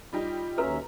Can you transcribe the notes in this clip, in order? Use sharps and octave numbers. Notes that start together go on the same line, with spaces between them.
G3 D#4 F4 G4
D#2 C#4 F#4 A4 B4 E5 A#5